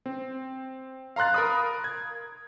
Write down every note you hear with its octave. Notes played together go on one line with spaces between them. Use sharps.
C4
F5 A#5 C6 F#6 A6
A#4 B5 D#6
G#6